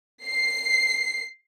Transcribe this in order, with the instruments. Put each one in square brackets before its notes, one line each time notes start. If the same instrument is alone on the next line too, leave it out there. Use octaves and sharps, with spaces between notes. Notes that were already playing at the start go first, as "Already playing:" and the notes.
[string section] C7